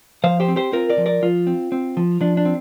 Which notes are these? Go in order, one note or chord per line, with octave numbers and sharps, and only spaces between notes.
F3 C5 F5
G4 C5
C4
G4 C5
C4 F4 A#4
A#4 D5
F3
A#4 D5
F3 F4
C4
C4
F3
F3 D4
D4
C4